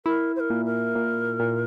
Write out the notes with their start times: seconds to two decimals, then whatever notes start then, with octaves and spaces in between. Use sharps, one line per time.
0.05 E4 A#4
0.35 C5
0.39 A#4
0.50 A#2
0.65 A#4
0.95 A#2
1.40 A#2